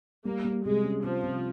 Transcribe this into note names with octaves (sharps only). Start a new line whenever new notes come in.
G3 A#3
G3
C3 G#3
C#4
C3 F3
C3